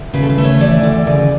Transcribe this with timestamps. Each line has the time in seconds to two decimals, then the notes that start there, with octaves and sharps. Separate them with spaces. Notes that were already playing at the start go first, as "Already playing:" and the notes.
Already playing: D2
0.13 C#3 B4
0.23 A4
0.29 B4
0.38 A3
0.44 C#5
0.60 E3 D5
0.83 D2 D5
1.07 C#3 D5